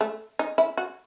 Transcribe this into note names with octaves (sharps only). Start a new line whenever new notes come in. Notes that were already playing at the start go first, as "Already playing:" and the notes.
A3
D#4
E4
F#4